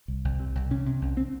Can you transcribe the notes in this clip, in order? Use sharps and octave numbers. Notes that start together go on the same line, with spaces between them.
C2
C2
C3
C2
C3 C#4
C3
C2
C4